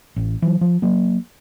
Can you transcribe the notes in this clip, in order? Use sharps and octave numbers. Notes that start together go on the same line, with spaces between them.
A1
E3 F#3
F3
F#3 A#3